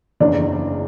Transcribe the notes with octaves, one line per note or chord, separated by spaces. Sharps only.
F#1 E2 C#3 E3 D4